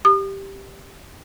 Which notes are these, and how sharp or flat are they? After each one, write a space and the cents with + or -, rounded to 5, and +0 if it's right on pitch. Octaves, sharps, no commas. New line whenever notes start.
G4 +0 D#6 -40